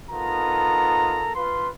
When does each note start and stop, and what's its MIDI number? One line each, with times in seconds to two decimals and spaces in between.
0.10 1.30 59
0.10 1.30 63
0.10 1.30 65
0.10 1.30 69
0.10 1.30 70
0.10 1.30 82
1.35 1.68 65
1.35 1.68 71
1.35 1.68 84